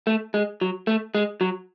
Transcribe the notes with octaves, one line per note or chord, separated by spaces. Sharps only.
A3
G#3
F#3
A3
G#3
F#3